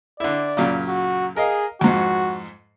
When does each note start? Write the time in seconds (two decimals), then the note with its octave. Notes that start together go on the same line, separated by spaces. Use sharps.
0.20 D3 E4 D5
0.57 F#2 A#2 C#3
0.88 F#4
1.36 G#4 A#4 D#5 F5
1.81 F2 G#2 F#4